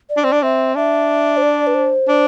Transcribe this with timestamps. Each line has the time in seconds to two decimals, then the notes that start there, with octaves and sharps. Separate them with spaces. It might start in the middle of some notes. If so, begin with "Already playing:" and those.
0.10 D5
0.17 D4
0.24 C4
0.32 D4
0.43 C4 E5
0.76 D4 E5
1.37 C5
1.42 D5
1.67 B4
1.74 C5
2.08 D4